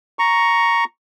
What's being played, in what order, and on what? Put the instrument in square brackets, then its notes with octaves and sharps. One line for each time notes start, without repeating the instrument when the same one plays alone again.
[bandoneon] A#5 C#6